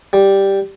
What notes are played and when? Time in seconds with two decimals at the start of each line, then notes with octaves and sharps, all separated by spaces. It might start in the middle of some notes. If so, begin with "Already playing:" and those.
0.13 G3